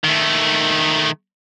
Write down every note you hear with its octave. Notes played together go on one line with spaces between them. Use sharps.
D#3 A3